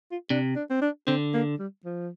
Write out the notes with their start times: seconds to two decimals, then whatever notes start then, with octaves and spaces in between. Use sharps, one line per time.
0.11 F4
0.30 C3 D4
0.56 D4
0.70 C4
0.82 D4
1.07 D3 C4
1.34 A#3
1.59 G3
1.85 F3